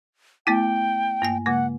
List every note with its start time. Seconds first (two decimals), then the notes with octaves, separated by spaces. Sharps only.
0.47 A3 B3 E4 G5
1.22 G2 A#3 G#5
1.46 C#3 G#3 A#3 F#5